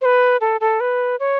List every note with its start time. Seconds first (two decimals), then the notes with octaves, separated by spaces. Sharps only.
0.01 C5
0.05 B4
0.41 A4
0.61 A4
0.80 B4
1.20 C#5